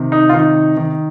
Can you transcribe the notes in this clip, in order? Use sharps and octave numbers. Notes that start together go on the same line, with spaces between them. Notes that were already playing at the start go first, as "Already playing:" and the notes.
Already playing: C3 D#3
D#4
F4
D#3 D#4
D#3